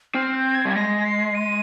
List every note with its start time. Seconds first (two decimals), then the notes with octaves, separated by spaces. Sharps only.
0.15 C4 F6
0.34 G6
0.55 G#6
0.65 G3 G#6
0.75 G#3 A#6
1.05 C7
1.35 D#7